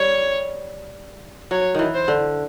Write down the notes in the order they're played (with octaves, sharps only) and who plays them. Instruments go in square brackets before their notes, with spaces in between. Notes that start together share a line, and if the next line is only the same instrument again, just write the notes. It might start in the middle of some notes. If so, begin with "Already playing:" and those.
Already playing: [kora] G3 [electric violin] C#5
[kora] F#3 [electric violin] C#5
[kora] D#3 E3
[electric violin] C5
[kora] D3